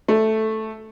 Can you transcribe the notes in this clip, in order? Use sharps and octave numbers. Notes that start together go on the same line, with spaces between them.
A3